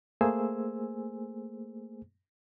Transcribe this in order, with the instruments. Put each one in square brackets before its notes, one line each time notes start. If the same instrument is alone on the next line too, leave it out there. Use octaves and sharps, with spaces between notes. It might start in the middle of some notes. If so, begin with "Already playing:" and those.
[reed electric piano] A3 A#3 G#4 C5 G#5 E6